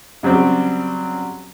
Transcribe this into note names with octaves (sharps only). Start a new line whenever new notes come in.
C#3 F#3 G3 C4 G4